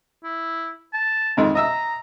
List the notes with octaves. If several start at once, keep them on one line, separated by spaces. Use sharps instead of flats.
E4
A5
F2 D#3 G#3
D#5 E5 A#5 E6